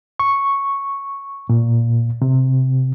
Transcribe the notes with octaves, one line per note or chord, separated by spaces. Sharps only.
C#6
A#2
C3